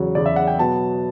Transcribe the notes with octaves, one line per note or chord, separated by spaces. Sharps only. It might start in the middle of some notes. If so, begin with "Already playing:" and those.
Already playing: E2 C#3 F#3
E2 C#3 F#3 D5
E5
F#5
G5
B2 F#3 B3 A5